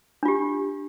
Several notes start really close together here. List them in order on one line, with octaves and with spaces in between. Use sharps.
D4 F4 G4